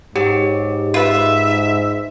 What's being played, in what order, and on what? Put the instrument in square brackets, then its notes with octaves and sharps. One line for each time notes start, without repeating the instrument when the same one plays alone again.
[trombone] G#2 [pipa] F#3 [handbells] G4
[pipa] F4 B4 [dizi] E5